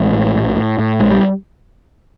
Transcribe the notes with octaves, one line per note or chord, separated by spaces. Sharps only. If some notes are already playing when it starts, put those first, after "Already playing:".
Already playing: A1 G#3
A2
A#1
A2
A2
A#1 G#3
G3